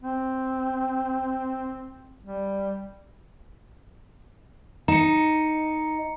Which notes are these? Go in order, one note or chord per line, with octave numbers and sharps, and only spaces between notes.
C4
G3
D#4 A#5 C#7